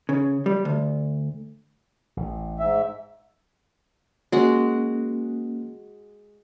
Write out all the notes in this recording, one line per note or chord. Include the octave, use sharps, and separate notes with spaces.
C#3
G3
D2
A1
G#2 E5
G#3 A#3 C#4 F#4